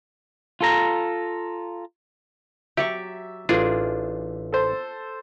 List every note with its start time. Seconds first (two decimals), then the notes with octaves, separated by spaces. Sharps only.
0.61 F4 A4 A#5
2.77 F#3 G4 D5 E5 C#6
3.49 A1 D4 F4 G#4
4.52 A4 C5